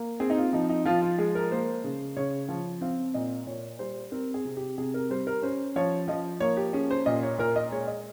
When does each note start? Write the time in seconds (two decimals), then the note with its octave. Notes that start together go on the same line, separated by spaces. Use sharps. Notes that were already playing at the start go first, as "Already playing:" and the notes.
Already playing: A#3
0.20 C4 G#4
0.30 D#4
0.37 F4
0.53 F3 D#4
0.69 D#4
0.85 F3 F4
1.02 F4
1.18 G#3 G#4
1.35 A#4
1.51 A#3 C5
1.84 C#3
2.17 C#3 C#5
2.48 F3
2.81 C4 F5
3.14 A#2 D#5
3.46 A#2 C#5
3.79 G3 C5
4.12 C4 A#4
4.34 G#4
4.45 C3
4.56 G4
4.78 C3 G#4
4.94 A#4
5.10 G3 C5
5.27 A#4
5.42 C#4 C5
5.76 F3 C#5
6.08 F3 D#5
6.40 A#3 C#5
6.57 G4
6.73 C#4 G#4
6.90 C5
7.06 A#2 D#5
7.23 C#5
7.38 A#2 A#4
7.56 D#5
7.71 G#3 C#5
7.87 D#5